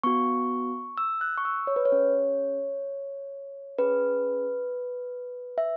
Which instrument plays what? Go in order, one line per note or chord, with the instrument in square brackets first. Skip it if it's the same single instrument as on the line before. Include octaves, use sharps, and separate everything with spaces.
[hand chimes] B3 F#4 C#6
E6
F#6
C#6
E6
C#5
B4
C#5
C#4 G#4
C#4 G#4 B4
E5